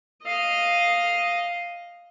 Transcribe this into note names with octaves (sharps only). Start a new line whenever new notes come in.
D#5 F5